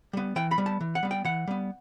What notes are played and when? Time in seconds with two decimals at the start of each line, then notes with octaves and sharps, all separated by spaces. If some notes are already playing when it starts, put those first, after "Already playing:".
0.13 G3 B3
0.36 E3 G5
0.51 B5
0.58 G3 B3
0.66 A5
0.81 E3
0.95 F#5
1.03 G3 B3
1.11 G5
1.25 E3 F#5
1.47 G3 B3